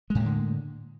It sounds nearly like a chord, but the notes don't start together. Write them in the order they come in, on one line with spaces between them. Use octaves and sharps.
G#3 A2 A#3 D3